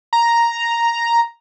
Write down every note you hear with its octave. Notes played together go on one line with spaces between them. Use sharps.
A#5